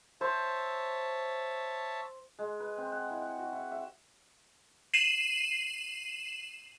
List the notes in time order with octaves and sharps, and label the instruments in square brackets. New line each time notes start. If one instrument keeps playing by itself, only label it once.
[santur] C5 [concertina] C#5 E5 A5
[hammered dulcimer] G#3
B4
C4
F#5
E4
F#5
F#4
E4
E5
[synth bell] C7 D#7 E7 F#7